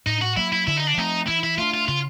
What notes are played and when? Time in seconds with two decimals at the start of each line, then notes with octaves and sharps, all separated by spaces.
0.07 A2 D#4
0.22 F#4
0.37 F#3 A#3 E4
0.53 E4
0.67 D3 E4
0.77 D#4
0.87 D4
0.98 F3 A3 C4 D#4
1.27 E3 E4
1.43 E4
1.58 A3 D4 F4
1.74 F4
1.88 C#3 F4